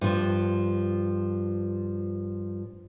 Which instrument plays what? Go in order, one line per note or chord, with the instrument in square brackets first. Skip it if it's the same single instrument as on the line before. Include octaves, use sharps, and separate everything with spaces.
[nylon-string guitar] G2 F3